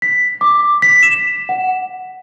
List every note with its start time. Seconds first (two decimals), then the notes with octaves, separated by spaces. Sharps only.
0.02 B6
0.41 D6
0.82 B6
1.03 E7
1.49 F#5